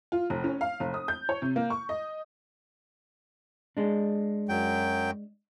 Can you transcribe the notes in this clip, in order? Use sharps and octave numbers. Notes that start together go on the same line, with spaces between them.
F4
F1
C#4
F5
F1
D#6
G6
C#5
C3
A#3
C#6
D#5
G#3 D4
F#2 F#3 G5